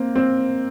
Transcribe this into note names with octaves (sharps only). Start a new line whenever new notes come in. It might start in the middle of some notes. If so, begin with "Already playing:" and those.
Already playing: A#3 C4
C4